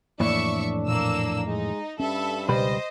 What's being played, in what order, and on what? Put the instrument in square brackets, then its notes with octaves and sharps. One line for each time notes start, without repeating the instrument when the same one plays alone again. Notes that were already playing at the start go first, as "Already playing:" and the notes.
[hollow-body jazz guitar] F2 A2 E3 [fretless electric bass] A#3 [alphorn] D4 [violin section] D5 E5 C#6
[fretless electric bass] A#2 [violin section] A#3 E6
[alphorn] G#3 [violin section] D#4
[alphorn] G2 [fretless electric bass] C#4 [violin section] A4 E5 B5
[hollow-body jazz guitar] C#2 G3 B4 [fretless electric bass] B2 [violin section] C5 D#5